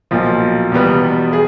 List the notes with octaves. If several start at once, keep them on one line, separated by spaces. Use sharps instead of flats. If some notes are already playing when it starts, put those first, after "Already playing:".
B1 A#2 F3
E2 B2 G3 B3
G#4